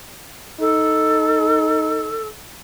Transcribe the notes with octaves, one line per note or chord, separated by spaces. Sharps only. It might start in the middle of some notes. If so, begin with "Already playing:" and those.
D#4 A4